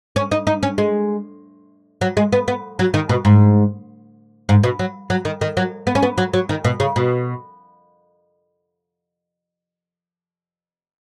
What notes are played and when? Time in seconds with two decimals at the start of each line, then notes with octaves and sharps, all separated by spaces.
0.16 C#4
0.31 D#4
0.47 D#4
0.63 C#4
0.78 G#3
2.01 F#3
2.17 G#3
2.32 B3
2.48 B3
2.79 F#3
2.94 D#3
3.09 B2
3.25 G#2
4.49 G#2
4.63 B2
4.79 F#3
5.10 F#3
5.25 D#3
5.41 D#3
5.57 F#3
5.87 B3
5.95 C#4
6.03 B3
6.18 F#3
6.33 F#3
6.49 D#3
6.64 B2
6.80 C#3
6.96 B2